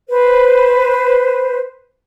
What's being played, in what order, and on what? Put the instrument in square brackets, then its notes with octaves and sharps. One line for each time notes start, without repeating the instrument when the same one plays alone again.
[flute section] B4 C5